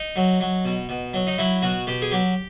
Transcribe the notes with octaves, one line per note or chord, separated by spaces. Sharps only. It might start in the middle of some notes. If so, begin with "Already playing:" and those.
Already playing: D#4
F#3
F#3
B2
B2
F#3
D#4
F#3 E4
B2 F#4
B2 G4
G#4
F#3 G4